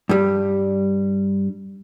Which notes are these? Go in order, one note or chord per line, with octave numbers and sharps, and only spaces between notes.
G2 G3